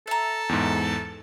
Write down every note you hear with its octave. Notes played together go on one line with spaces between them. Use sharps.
A4 E5 A#5
E2 G#2